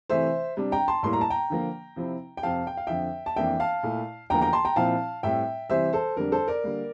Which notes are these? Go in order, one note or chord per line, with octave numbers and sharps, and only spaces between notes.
C3 E3 A3 C5 E5
C3 G3 D4
G5 A#5
A5 C6
A2 G3 A#3 E4 C6
A#5
A5
G5 A#5
D3 F3 A#3
C3 F3 C4 E4
G5
F2 C3 F3 C4 F5 A5
G5
F5
F2 D3 F3 E5 G5
A5
F2 E3 A#3 D4 E5 G5
F5 A5
A#2 A3 E4
E2 D3 F3 A#3 G5 A#5
G5 A#5
A5 C6
G5 A#5
A#2 F3 C4 E4 F5 A5
A2 G3 C4 E5 G5
C3 E3 G3 C5 E5
A4 C5
F2 D3 G3 D4 A#4
A4 C5
A#4 D5
D3 G3 A#3